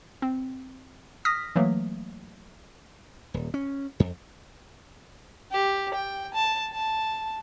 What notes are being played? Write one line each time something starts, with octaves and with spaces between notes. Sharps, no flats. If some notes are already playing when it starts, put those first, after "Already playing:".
C4
D#6 F6 A#6 B6
E3 F#3 A3 A#3
D#1
C#4
F2
G4
G5
A5
A5